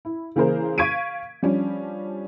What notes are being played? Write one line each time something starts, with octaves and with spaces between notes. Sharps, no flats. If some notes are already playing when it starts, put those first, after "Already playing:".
E4
C#3 E3 A#3 G#4 A#4 C5
F5 C#6 G#6 B6 D7 D#7
F3 G3 C#4 D4